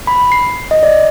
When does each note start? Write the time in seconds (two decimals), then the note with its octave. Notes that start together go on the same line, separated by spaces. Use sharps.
0.07 B5
0.32 C7
0.71 D#5
0.83 D5